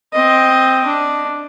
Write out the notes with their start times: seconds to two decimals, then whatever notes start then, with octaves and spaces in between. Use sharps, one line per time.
0.13 C4 D#5
0.87 D4